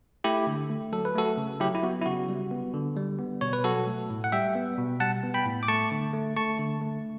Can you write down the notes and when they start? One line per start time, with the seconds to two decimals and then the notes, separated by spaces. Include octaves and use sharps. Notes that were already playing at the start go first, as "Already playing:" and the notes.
0.24 A3 E4 G4
0.47 D3
0.70 A3
0.93 F#3 A4
1.05 B4
1.16 A3 F#4 A4
1.38 C#3
1.60 F#3 E4 G4
1.75 E4
1.83 B3 F#4
2.01 E4
2.06 C#3 F#4
2.29 G3
2.51 B3
2.74 D3
2.96 G3
3.19 B3
3.41 B2 C#5
3.53 B4
3.64 F#3 F#4 A4
3.87 A3
4.10 A2
4.24 F#5
4.32 G3 E5 G5
4.55 B3
4.78 B2
5.00 G3 F#5 A5
5.23 B3
5.34 G5 B5
5.46 A2
5.63 D6
5.68 A3 A5 C#6
5.91 D3
6.14 A3
6.36 A3 A5 C#6
6.59 D3
6.82 A3